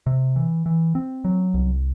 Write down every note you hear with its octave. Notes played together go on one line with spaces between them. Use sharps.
C3
E3
E3
C4
F#3
C2